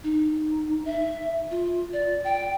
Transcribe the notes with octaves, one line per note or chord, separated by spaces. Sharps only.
D#4
E5
F4
D5
G5